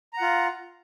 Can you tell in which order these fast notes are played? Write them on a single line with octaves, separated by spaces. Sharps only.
A#5 F#5 F4